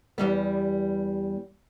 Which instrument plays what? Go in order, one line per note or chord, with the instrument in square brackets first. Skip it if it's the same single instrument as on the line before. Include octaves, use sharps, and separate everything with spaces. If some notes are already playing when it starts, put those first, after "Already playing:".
[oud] E2 G3 B3